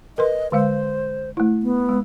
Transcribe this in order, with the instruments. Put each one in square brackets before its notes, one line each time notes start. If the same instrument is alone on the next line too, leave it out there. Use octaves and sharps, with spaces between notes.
[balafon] A#4 B4 C6 [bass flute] D#5
[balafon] D3 G#3 F5 [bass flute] C5
[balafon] A3 E4
[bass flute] B3
[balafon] G#3